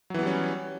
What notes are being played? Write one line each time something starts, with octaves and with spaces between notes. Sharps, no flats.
E3 F#3 G3 B3 C#4